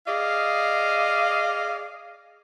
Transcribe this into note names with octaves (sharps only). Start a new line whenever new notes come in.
G#4 D5 D#5 F5